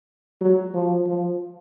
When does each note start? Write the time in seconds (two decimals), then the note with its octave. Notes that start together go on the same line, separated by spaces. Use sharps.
0.41 F#3
0.74 F3
1.06 F3